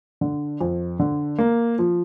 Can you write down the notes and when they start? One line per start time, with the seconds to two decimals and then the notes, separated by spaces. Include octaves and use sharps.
0.21 D3
0.61 F2
1.00 D3
1.38 A#3
1.79 F3